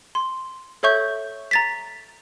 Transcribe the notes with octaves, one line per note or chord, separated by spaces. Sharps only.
C6
A4 C#5 E5 C#6 G6
A#5 A6 B6